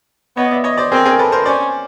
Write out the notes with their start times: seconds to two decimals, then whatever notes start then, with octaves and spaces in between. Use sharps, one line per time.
0.37 B3 C#5 D#5
0.51 D5 E5
0.64 C#5 D#5
0.77 C5 D5
0.92 C4 G#4 A#4
1.05 G#4 A#4
1.19 A4 B4
1.32 A#4 C5
1.46 C#4 C5 D5